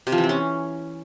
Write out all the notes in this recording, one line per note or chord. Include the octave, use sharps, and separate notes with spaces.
C3
F3
E3
C4
C#4